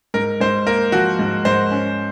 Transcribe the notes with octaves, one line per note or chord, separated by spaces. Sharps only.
G#2 A#4
G#2 C5
A#3 A#4
F3 F#4
G#2
G#2 C5
C#4